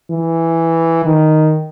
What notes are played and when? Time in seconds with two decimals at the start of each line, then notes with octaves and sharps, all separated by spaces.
0.11 E3
1.05 D#3